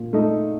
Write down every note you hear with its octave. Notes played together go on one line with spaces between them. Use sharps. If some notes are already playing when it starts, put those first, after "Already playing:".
Already playing: A#2
A3 D#4